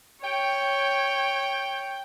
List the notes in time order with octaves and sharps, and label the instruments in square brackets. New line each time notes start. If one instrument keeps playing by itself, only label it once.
[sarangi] C#5 [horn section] G5